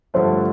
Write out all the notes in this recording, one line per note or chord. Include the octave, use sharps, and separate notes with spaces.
G2 D3 F3 A3 C5